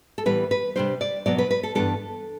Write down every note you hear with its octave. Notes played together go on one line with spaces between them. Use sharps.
A4
A2 E3 G3 B3 B4
B4
C3 G3 D4 C5
D5
B2 F#3 B3 D5
B4
B4
A4
G2 E3 B3 D4 A4